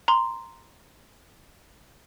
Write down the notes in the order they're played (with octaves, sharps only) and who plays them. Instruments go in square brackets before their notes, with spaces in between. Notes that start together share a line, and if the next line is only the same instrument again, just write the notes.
[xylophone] A#5 C6